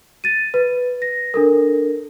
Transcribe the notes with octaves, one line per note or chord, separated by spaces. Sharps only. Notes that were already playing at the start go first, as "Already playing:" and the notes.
A6 D#7
B4
A#6
D4 A4 A#4